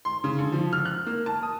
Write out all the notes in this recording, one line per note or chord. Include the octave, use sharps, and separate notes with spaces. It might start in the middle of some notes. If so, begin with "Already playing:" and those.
C6
C#3
D3
F3
F6
F#6
A#3
A5
D#6